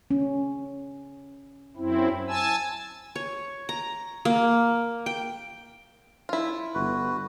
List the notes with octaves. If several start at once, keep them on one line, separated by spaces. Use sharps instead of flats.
C#4
F#2 C4 E4
G#5 A5 E6
C#5
A#5
A#3
G5
E4 F4
G1 F#4 B4